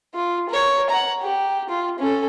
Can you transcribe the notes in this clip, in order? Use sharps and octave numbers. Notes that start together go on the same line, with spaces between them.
F4
A#4 C#5
F#5 A#5
G4
F4
C#4 A4